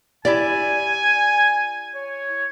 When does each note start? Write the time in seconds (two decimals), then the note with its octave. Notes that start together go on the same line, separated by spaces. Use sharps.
0.25 E4 G4 D5 G#5
1.95 C#5